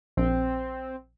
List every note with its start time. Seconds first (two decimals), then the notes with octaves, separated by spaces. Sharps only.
0.17 A#1 C4